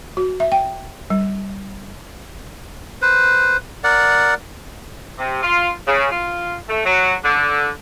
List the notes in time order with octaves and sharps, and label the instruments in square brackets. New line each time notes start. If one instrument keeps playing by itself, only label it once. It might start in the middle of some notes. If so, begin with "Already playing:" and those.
[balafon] F#4
E5
G5
G3
[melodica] B4 C5
A#4 D5 F#5
[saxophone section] C3
F4
C#3
F4
A3
F#3
D3